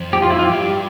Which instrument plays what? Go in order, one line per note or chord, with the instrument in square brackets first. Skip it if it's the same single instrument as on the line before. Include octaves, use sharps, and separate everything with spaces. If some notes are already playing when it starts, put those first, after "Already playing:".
Already playing: [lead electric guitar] F2
[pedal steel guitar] G4
F4
E4
F4
[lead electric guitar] G2 [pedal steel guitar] G4